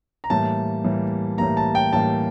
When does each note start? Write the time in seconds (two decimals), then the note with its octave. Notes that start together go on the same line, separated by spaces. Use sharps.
0.24 A#5
0.30 A2 E3 G3 A#3 A5
0.84 A2 E3 G3 A#3
1.38 A2 E3 G3 A#3 A#5
1.57 A5
1.75 G5
1.93 A2 E3 G3 A#3 A5